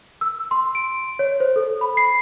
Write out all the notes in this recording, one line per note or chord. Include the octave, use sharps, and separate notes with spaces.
E6
C6
D7
C#5
C5
A4
B5
C7